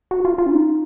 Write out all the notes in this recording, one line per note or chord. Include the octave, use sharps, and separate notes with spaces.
F#4
F4
F4
C#4
D#4